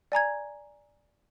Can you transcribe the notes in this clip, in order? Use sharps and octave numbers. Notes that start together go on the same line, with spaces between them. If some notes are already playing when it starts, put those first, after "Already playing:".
D5 G#5 A#5 G#6